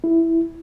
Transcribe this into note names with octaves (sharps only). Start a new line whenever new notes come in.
E4